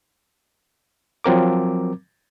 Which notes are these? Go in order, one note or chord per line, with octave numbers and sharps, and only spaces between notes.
F3 F#3 C4 A#4 D6